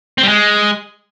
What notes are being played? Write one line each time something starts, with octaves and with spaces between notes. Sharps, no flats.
C4
G3
G#3